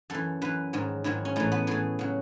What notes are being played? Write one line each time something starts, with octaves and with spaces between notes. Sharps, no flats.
F#2 E3 A4
F#2 E3 B4
G#2 D#3 F#3
G#2 D#3 F#3 E4
C#4
A2 E3 D#4
B3
A2 E3 G#4
C#3 F#3